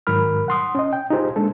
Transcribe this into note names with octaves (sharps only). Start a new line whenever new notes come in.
G#2 D#3 F#3 A#4 B5 F6
F#5 C6 D#6
C#4 D#5
G5
D#4 F4 G4 G#4 C5
G#3 A#3 D4 A4